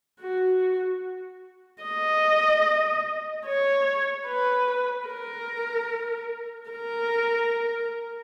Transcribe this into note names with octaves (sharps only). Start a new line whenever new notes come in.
F#4
D#5
C#5
B4
A#4
A#4